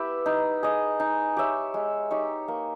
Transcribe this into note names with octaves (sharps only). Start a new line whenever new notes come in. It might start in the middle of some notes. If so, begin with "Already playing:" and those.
Already playing: B3 E4 G4 B4 E5
D#4
G#4 D#5
D#4
G4 C#5 E5
G#3
D#4 G4 C#5
A#3